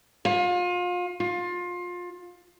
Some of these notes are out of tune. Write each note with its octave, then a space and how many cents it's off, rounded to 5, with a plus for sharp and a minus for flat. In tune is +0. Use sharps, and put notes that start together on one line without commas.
F4 +35
F4 +25